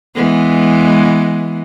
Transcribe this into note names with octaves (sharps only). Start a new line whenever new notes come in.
E3 G#3 B3